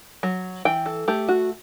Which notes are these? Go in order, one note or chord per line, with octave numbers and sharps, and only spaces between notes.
F#3
E3 G5
A4
A3 G4
F#4